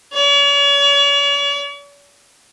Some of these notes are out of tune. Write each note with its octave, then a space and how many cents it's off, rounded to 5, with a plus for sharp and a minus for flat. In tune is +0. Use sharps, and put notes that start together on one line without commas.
C#5 +45